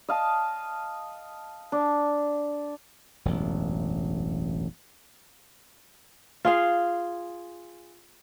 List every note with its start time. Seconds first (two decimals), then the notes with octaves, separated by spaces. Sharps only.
0.08 D#5 F5 A5
1.72 D4
3.25 E1 A1 F#2
6.45 F4 G#4 F5